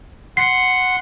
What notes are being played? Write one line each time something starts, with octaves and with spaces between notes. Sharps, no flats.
F#5 C6 C7